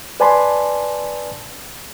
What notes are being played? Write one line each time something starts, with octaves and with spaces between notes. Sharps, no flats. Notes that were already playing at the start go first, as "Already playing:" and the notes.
B4 D5 G#5 A5 B5 C6